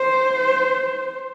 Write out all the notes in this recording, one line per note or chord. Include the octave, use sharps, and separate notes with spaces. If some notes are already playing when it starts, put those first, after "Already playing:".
Already playing: C5